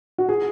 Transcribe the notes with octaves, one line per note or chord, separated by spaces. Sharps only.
F#4
G#4